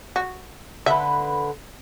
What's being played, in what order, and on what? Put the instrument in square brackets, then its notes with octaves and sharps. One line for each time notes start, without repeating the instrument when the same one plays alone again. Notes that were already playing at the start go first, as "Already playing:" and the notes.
[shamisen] F#4
[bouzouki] D3 B4 [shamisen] E5